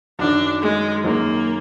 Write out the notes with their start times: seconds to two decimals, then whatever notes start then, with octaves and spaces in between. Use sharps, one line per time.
0.19 F#2 D#3 F#3 D4
0.62 G#3
1.04 F#2 D#3 F#3 A#3